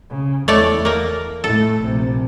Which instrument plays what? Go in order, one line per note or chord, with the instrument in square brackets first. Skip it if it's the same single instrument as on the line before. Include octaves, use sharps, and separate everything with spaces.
[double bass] C#3
[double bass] E2 [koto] A3 C#5 D5
[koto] A#3 A#4
[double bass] A2 A3 [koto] A4
[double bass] A#1 C3